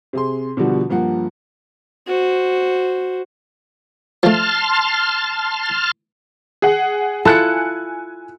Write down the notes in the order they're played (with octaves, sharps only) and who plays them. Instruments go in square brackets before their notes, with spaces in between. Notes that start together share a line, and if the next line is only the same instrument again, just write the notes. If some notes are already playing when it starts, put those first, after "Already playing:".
[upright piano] C3 G#4 C6
B2 D3 F3 G3 F#4
G2 F3 A#3 F#5
[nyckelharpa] F#4 C5
[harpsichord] F3 A3 [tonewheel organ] A5 C6 F6
[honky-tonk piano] G#4 F#5
[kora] E4 F4 A4 [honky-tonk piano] G#5 F#6 C#7